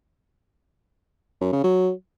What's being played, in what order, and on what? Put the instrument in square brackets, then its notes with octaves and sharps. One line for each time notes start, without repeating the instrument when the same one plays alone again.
[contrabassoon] F#2
C#3
F#3